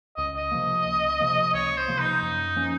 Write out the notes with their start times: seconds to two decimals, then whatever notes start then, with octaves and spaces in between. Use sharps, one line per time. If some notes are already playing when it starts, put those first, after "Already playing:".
0.17 C#2 D#5
0.37 D#5
0.52 C3 F3 A#3
0.85 C#2
1.20 C3 F3 A#3
1.54 C#2 C#5
1.77 C5
1.88 C3 F3 A#3
1.99 D#4
2.22 F#2
2.56 F3 A#3 C#4